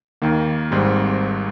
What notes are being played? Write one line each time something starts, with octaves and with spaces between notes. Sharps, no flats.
D#2 D#3 A#3
G#1 G#2 G3 C4